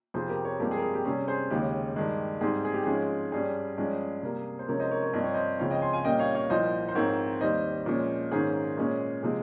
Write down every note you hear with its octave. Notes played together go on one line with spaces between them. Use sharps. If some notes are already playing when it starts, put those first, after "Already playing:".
F2 C3 F3 G#4 C5
G4 A#4
A#4 C#5
G2 F3 G#3 C4 G4 A#4
G#4
A#4
G#4
G4
C3 G3 C#4 G#4
G#4 C5
D#2 C#3 G#3 G4
G2 D#3 G#3
G#2 G3 C4 G#4
G#4
G4
G#2 F3 G#3 C#4 G#4
G2 G3 C#4 G#4
G2 F3 G#3 C#4
C3 G3 A#3
C5
C3 F3 G#3 C#4 A#4 C#5
C5 D#5
A#4 C#5
A#4 C#5
G2 F3 C4 D#5
C#5
C5 D#5
C#2 C#3 F3 C4 C#5 F5
D#5 G5
G#5 C6
F5 G#5
A#2 G3 A#3 C#4 D#5 G5
C#5 F5
C#5 F5
C2 A#2 F3 C5 D#5
C5
G#2 F3 C4 A#4 C#5
D#2 D#3 G3 C5 D#5
A#2 F3 G#3 C#4
G#2 D#3 A#3 C#4 G#4 C5
A#2 G#3 C#4
C3 F3 G#3 G#4